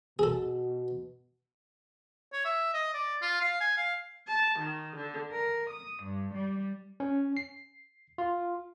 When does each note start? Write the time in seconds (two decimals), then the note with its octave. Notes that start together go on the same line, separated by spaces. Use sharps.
0.19 B2 G#4 A4
2.33 C#5
2.45 E5
2.74 D#5
2.94 D5
3.22 F4
3.41 F5
3.60 G#5
3.77 F5
4.27 A5
4.60 D#3
4.96 D3
5.32 A#4
5.71 D#6
6.03 G2
6.35 G3
7.00 C#4
7.37 C7
8.18 F4